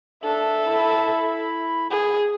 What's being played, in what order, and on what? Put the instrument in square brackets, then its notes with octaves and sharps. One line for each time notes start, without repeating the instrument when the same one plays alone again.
[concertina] D4 [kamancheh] A4 E5
[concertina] E4 B5
[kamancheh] G#4